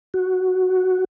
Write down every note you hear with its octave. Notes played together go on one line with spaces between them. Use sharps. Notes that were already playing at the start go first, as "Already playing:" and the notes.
F#4